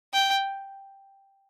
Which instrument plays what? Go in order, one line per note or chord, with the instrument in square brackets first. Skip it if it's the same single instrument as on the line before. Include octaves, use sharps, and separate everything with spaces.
[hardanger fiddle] G5